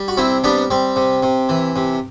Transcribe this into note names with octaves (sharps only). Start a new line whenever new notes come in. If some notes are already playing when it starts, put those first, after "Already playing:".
Already playing: G3
F#4
C3 C4 E4
G3 B3 D4
G3 C4
C3
C3
E3
C3